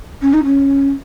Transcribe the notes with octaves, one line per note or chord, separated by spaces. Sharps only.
C#4
D#4
C#4